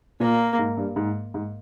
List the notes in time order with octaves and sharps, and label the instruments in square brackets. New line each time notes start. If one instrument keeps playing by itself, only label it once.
[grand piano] A#2 [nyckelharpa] A#3
[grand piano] G#2
G2
G#2
G#2